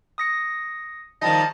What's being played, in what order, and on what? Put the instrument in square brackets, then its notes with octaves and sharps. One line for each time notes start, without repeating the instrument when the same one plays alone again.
[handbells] D#6 A#6 C#7
[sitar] D#3 F3 G3 [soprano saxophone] D#5 [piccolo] A5